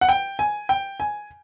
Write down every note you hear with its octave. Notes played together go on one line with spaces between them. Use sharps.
F#5
G5
G#5
G5
G#5